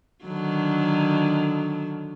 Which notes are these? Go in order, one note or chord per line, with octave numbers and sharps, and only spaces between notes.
D3 D#3 F#3